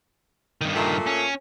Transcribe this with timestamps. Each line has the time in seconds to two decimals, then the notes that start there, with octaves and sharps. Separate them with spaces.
0.61 G2 D#3
0.75 A#2 A3
1.07 C#4